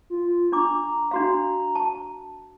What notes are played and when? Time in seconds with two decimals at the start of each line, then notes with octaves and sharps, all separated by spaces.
0.10 F4
0.52 D4 A#5 D6
1.11 D4 F#4 F5
1.75 A5